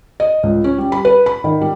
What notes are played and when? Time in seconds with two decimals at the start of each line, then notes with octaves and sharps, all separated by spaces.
0.20 D#5
0.43 C#2
0.64 C#4
0.78 G3
0.92 B5
1.05 B4
1.26 B5
1.44 D#3
1.61 G3